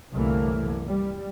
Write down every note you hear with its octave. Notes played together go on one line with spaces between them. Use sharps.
C2 F#2 D3 E3 A3 A#3
G3